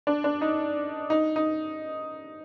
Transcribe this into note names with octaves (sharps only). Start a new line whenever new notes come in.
D4
D4
D#4
D#4
D#4